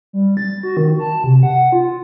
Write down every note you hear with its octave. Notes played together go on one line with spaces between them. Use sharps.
G3
A6
F#4
D#3
A5
C3
F#5
F4